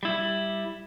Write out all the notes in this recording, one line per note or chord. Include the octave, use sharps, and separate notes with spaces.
G3 E4